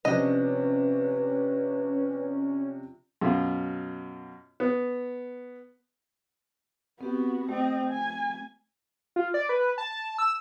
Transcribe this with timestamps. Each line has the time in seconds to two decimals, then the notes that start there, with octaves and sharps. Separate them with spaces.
0.05 C3 F3 C#4 D4 B4 D#5
3.21 F#2 B2 F4
4.60 B3
7.01 B3 C4 F#4 G4
7.49 A3 C4 D#5
7.90 G#5
9.16 F4
9.34 D5
9.49 B4
9.78 A5
10.18 E6